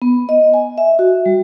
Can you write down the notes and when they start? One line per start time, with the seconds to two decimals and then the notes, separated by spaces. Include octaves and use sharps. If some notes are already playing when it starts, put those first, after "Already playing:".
0.02 B3
0.29 D#5
0.54 G#5
0.78 E5
0.99 F#4
1.26 G3